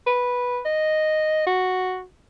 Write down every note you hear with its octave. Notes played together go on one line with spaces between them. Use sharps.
B4
D#5
F#4